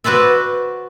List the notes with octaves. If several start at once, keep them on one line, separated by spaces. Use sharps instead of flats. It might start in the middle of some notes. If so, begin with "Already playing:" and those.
F#4 B4 C5 D5 E5